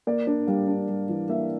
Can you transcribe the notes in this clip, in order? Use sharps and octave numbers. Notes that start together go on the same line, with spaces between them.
A#3 D5
D4
G3 F5
D4
G3
E3
A#3 E5